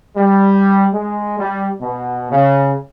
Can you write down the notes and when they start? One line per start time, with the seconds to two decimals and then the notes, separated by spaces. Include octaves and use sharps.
0.16 G3
0.93 G#3
1.39 G3
1.80 B2
2.31 C#3